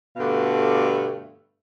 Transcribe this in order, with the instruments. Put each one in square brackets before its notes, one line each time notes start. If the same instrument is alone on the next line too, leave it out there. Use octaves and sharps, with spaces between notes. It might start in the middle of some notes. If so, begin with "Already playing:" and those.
[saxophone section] G2 B2 D3 A3 F5